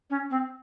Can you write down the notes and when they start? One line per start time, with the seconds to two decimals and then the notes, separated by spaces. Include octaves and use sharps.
0.10 C#4
0.30 C4